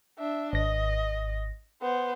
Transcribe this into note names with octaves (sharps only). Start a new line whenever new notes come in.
D4 E5
G#1 D#5 A#6
B3 C5